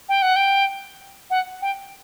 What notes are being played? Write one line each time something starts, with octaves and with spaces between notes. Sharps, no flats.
G5
F#5
G5
F#5
G5